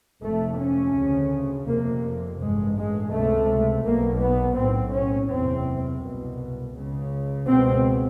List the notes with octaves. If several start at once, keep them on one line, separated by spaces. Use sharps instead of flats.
F1 F2 C3 A3
C#4
D2 C#3
F1 F2 C3 A#3
A1 G2 G#3
G#3
C#2 C3 A3
B1 B2 A#3
B3
B1 A2 C4
C#4
F#1 E2 C3 C4
C2 B2
C#2 C#3
C#2 B2 C4